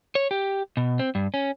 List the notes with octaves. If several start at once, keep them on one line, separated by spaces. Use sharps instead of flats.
C#5
G4
B2
C4
G2
C#4